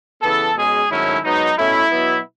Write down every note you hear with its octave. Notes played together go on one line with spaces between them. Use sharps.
C#3 E3 B3 A4
B2 G#3 C#4 G#4
G#2 D#3 F#3 A3 C#4 E4
G#2 F#3 B3 D#4
B2 A3 C#4 E4
B2 F#3 B3